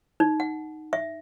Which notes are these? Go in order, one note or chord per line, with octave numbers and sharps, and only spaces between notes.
D#4
F#5
E5